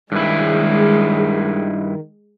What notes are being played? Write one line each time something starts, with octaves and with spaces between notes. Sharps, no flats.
G2 D#3 G#3 E4